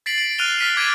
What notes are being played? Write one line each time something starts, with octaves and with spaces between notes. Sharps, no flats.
A6 B6 C7 D7 F#7
D7
F6 F#6 A6 D#7 F7 G7
F6 B6 D#7
D6 G#6 A6 B6 D7 D#7